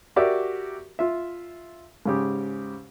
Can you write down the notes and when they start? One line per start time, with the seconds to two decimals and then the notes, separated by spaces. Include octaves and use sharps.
0.16 F#4 G4 A#4 D5 E5
0.99 F4 E5
2.06 G#2 C#3 G4